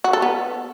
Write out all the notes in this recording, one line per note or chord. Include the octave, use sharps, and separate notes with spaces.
F#4
A4
B3